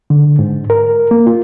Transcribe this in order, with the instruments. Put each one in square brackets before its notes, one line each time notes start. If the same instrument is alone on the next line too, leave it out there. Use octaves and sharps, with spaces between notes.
[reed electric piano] D3
G#2
A#4
A#3
F4